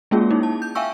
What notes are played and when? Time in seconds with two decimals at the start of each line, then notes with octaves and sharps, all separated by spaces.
0.11 G#3 A#3 C#4 F4 G#4
0.31 A#3 D#4 E4
0.43 A5
0.62 G6
0.75 E5 F5 G5 G#5 C#6 E6